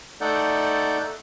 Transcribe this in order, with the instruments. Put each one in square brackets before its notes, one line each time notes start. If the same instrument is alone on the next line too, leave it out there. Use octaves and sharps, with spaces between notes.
[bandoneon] A3 D#4 A4 D5 F#5 G6